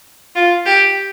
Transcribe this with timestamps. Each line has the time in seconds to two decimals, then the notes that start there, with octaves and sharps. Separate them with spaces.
0.36 F4
0.66 G4